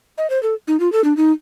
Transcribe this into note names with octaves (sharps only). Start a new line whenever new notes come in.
D#5
C5
A4
D#4
F4
A4
D4
D#4